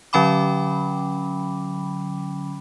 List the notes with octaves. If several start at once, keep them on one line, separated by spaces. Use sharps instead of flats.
D3 F#3 C#4 G5 B5 D6